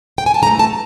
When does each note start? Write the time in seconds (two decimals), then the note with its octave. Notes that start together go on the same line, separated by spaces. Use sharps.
0.18 G5
0.26 G#5
0.34 A5
0.42 C#3 E3 A3 A#5
0.59 A5